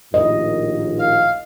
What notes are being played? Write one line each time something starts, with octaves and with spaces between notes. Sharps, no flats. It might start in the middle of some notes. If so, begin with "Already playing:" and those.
A#1 D#2 A2 D#5
F5